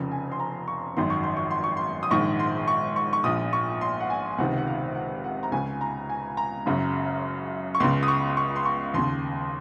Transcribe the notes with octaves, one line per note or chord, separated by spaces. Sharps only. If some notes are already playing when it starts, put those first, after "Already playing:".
Already playing: F1 F2 C#3
G#5
C6
A#5
C#6
G#1 F#2 D#3 C6
C#6
C6
C#6
C6
C#6
C6
D#6
A#1 G#2 D#3 C#6
C6
C#6
C#6
C#6
A#1 A#2 D#6
C#6
C6
F#5
G#5
C#2 C3 D#3 F#5
F#5
F5
F#5
F#5
A#5
C#2 C#3 G#5
A#5
G#5
A#5
F#1 F#2 C#3
C#6
C#2 C#3 C6
D#6
C#6
C#6
C6
C#6
D#2 C#3 C6